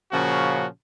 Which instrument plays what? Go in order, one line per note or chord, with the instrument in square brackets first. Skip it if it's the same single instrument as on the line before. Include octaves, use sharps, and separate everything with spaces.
[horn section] A#2 C#3 F3 C#4 F#4